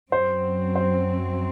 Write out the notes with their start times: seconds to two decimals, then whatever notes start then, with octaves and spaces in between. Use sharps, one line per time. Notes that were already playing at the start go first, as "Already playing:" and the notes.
0.12 F#2 F#3 C4 C5
0.76 C5